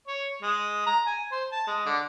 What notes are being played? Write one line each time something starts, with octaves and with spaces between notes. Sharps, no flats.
C#5
G#3
A#5
G#5
C5
A5
G#3
D3